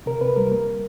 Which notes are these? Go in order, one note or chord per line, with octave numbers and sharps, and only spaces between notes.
C3 A#4
C3 B4
G3 A#4
A#3 A#4